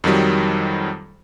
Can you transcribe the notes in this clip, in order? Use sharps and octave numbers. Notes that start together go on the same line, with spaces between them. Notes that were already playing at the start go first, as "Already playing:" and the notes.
F2 D#3 F#3 G3